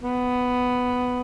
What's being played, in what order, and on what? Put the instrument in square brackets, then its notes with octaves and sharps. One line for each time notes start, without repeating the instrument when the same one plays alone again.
[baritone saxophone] B3